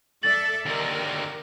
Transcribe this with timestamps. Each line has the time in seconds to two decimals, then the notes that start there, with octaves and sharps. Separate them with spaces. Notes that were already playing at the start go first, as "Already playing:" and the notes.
0.23 A4 D5 E5 A6 F#7
0.66 D#2 D3 A#4